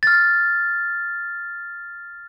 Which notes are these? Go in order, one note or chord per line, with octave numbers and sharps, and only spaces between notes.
F6 A6